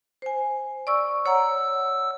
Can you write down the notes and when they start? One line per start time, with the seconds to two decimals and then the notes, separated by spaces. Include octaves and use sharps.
0.22 C5 G#5
0.87 D5 C#6 E6
1.26 C#5 F#5 A#5 E6